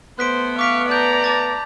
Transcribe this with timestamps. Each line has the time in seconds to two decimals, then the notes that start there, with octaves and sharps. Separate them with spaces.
0.19 A3 B3 C5 F#6 B6 D7
0.59 F5 C#6 D6 B6 D7
0.89 D5 A5 A#5 G6
1.24 A5 D6 A6